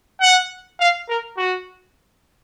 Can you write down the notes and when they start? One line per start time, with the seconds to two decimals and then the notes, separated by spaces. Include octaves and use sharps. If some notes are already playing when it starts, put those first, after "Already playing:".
0.22 F#5
0.80 F5
1.09 A#4
1.37 F#4